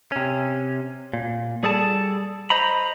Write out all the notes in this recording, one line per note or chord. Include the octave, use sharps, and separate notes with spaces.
C3 C#4
A#2
G3 G#4 A4 D5 A5
C5 D#5 A#5 B5